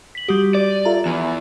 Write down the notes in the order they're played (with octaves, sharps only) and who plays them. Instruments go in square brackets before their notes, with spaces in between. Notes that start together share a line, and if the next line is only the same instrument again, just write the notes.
[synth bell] B6 F#7
[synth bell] G3 G4 [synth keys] F#4 D#6
[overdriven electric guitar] D5 [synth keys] D#7
[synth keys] F4 A4 E5 [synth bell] A#5
[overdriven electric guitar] E2 [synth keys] G#5